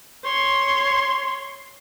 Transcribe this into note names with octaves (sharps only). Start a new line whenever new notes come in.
C#5 C6